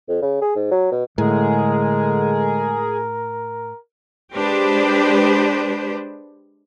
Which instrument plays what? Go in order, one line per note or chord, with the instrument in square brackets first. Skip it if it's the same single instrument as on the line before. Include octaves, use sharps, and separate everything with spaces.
[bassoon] F2
C#3
G#4
G#2
F#3
B2
[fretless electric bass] A2 [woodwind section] D3 G#3 [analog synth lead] G#4 [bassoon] A#4
[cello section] G#3 D4 G4 B4 C5